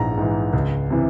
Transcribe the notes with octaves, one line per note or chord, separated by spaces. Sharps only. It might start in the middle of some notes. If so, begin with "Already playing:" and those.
Already playing: A#1 G#2 E3 A#5
G#2 E3
C#2
C3 E3